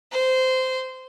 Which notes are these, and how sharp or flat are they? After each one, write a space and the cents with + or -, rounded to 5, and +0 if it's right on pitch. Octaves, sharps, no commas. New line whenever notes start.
C5 -15